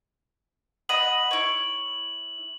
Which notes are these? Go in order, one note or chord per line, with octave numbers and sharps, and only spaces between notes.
D#5 F#5 B5 F#7
E4 C#5